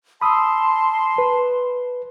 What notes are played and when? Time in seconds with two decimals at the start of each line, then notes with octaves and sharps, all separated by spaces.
0.21 A5 B5 C6 D#6 E6
1.18 B4